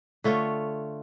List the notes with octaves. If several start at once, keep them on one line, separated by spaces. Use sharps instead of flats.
D3 A3 F4 C#5